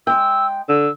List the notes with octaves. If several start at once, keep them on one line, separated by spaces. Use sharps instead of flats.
G#3 G5 E6
D3 E6